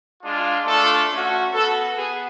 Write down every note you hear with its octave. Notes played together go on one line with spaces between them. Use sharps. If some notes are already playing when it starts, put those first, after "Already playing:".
G#3 D4 F4
A3 D4 F4 A4
A3 C#4 F#4
B3 F#4 A4
B3 G#4